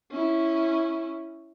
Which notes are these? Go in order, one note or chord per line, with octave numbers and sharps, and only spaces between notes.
C#4 E4